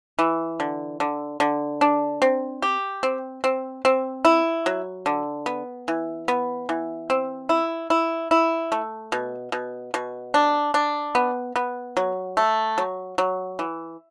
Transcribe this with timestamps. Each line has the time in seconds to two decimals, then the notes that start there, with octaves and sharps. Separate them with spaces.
0.19 E3
0.60 D3
1.00 D3
1.40 D3
1.81 D4
2.22 C4
2.62 G4
3.03 C4
3.44 C4
3.85 C4
4.25 E4
4.66 F#3
5.06 D3
5.46 B3
5.88 E3
6.28 B3
6.69 E3
7.10 C4
7.49 E4
7.90 E4
8.31 E4
8.72 A3
9.12 B2
9.52 B2
9.94 B2
10.34 D4
10.74 D4
11.15 B3
11.56 B3
11.97 F#3
12.37 A3
12.78 F#3
13.18 F#3
13.59 E3